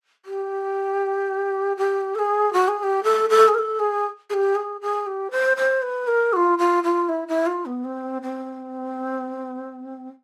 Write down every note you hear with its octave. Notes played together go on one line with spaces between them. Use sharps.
G4
G4
A4
G#4
F#4
G#4
G#4
G4
A4
A4
G#4
A#4
A4
G#4
G#4
G4
G#4
G#4
G4
C5
C5
B4
A#4
F#4
F4
F4
F4
E4
E4
F4
B3
C4
C4